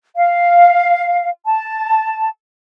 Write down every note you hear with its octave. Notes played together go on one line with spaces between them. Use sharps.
F5
A5